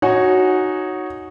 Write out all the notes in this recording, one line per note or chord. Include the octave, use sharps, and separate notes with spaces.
D#4 F#4 C#5 F#5 G#5